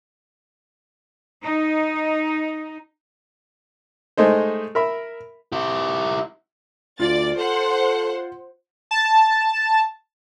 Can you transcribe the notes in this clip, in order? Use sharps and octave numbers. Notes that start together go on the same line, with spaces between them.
D#4
G#3 A3 D#4 C5
A#4 E5 B5
E4 G4
D2 F4 D5 A6
A4 C5 F#5
A5